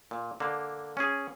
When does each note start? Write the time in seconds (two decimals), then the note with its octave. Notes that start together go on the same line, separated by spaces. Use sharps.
0.11 A#2
0.40 D3 A#3
0.97 C#4 G#4